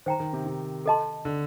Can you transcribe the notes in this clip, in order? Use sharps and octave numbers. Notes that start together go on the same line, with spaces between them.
D#3 C5 G5 A#5
D#3
C3
C3
A4 D#5 A5 C6
D3